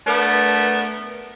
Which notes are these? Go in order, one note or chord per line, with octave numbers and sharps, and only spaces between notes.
A3 B3 D4 A#4 B4